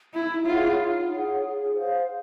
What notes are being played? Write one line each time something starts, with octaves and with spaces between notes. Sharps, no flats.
D#4 E4
F4 G#4 C#5 F#5
D#4
G#4 C#5 F#5
G#4
C5 F5